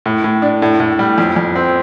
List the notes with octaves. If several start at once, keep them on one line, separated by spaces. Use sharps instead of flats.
A2
A2
D4
A2
A2
G3
F2
F2
C4